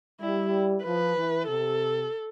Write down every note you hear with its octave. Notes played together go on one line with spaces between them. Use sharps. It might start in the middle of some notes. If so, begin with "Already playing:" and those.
G3 E4
F3 B4
E3
C3 A4